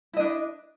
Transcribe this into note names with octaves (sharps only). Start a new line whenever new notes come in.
D4 E4 B4 D#5